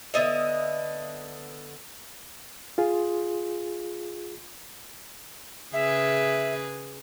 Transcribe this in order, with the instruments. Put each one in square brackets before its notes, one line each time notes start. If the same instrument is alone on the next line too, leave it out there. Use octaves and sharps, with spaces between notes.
[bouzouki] D3 B3 D#5 E5
[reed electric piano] F4 G#4
[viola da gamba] C#3 G#4 B4 [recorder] E5